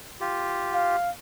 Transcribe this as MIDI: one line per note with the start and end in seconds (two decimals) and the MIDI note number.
0.21 0.96 65
0.21 0.96 67
0.74 1.10 77